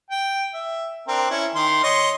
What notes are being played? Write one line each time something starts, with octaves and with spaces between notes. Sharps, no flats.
G5
E5
C4 D4 A#4
C#4 E4
D#3 C6
C#5 D#5 C6